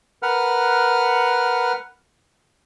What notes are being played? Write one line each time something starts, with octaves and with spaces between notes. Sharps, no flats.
A#4 B4 F#5 F6